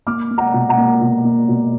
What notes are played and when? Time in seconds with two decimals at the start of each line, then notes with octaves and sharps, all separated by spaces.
0.07 A#3 D6 F6
0.31 A#3
0.38 F#5 A#5
0.54 B2
0.69 F#5 A#5
0.78 A#3
1.01 B2
1.25 A#3
1.49 B2